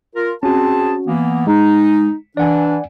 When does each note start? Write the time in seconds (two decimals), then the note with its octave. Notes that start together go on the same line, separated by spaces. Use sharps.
0.15 F4 A#4
0.43 C4 C#4 F#4 G#4 A5
1.06 E3 A#3 B3
1.47 G#3 D#4
2.37 E3 D4 D5 F#5 G#5